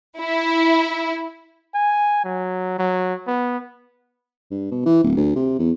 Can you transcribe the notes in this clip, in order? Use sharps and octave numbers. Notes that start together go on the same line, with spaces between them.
E4
G#5
F#3
F#3
B3
G2
B2
E3
D1
D2
C3
E2